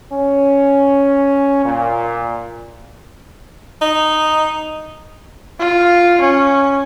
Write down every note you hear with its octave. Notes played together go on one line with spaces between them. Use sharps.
C#4
A#2
D#4
F4
C#4